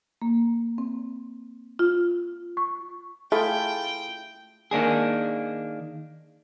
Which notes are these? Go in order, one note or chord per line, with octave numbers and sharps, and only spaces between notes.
A#3
C4
F4
C#6
A3 E4 F4 G#4 G5
D#3 A#3 D4 G#4